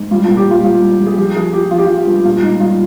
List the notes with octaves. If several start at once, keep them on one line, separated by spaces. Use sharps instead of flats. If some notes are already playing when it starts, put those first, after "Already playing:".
Already playing: G#2
G3 F4
F4
A#2
G4
G3
F4
G3 F4
G3
G3
G#4
F3 G4
F3 G#4
F3 G4
F3 F4
G4
F4
F3
F4
G2
A#2 F4
G3 D#4
G3 F4